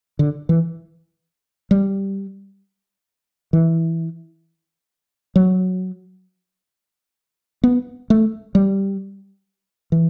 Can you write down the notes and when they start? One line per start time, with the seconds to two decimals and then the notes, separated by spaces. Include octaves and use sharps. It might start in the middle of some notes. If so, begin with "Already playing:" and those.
0.19 D3
0.49 E3
1.71 G3
3.53 E3
5.36 F#3
7.64 B3
8.10 A3
8.55 G3
9.92 E3